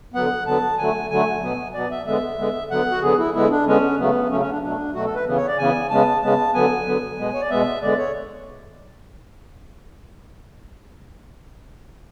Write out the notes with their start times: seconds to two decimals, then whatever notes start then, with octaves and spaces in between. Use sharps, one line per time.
0.14 D3 F#3 B3 F#5
0.46 D3 F#3 B3 A5
0.78 D3 F#3 A3 G#5
1.10 D3 F#3 A3 G#5
1.42 B2 F#3 B3
1.74 B2 F#3 B3 D5
1.91 E5
2.06 D3 G#3 B3 E5
2.38 D3 G#3 B3
2.70 D3 F#3 B3 F#5
2.91 F#4
3.02 D3 F#3 B3 G#4
3.18 E4
3.34 D3 G#3 B3 E4
3.51 D4
3.66 D3 G#3 B3 C#4
3.99 C#3 F#3 A3 B3
4.30 C#3 F#3 A3 C#4
4.40 C#4
4.52 D4
4.62 B2 F#3 A3 D4
4.94 B2 F#3 A3 F#4
5.05 A4
5.15 B4
5.26 C#3 E3 B3
5.37 C#5
5.48 D5
5.58 C#3 E3 B3 G#5
5.90 C#3 G#3 B3 A5
6.22 C#3 G#3 B3 A5
6.54 D3 F#3 B3 G#5
6.86 D3 F#3 B3
7.18 B2 G#3 B3
7.33 C#5
7.41 D5
7.50 B2 G#3 B3 E5
7.82 D3 G#3 B3 D5
7.98 C#5